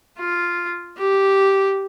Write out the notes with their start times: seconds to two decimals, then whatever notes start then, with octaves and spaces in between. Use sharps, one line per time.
0.19 F4
0.98 G4